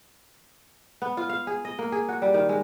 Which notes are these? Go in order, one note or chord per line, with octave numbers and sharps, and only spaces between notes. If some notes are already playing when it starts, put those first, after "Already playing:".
B3
F4
F5
G#4
D#5
A#3
G#4
F#4
G3
D#3
G#3